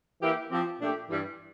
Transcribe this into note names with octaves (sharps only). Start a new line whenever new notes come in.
E3 A#3 E4 G4
F3 C4 G4
A#2 A3 D4 G4
G2 E3 G3